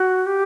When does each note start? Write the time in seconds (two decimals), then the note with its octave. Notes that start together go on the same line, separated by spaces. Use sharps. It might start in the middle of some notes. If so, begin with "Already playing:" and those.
Already playing: F#4
0.26 G4